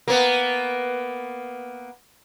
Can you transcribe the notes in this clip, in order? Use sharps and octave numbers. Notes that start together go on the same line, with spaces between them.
A#3 B3